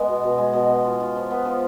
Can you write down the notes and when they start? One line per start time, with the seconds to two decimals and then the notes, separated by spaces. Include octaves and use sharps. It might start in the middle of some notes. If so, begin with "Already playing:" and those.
Already playing: G#3 B3
0.08 B2
0.23 B2
0.38 G#3
0.53 B2
0.68 B3
0.84 F4
1.00 F4
1.16 F3
1.30 B3
1.45 F3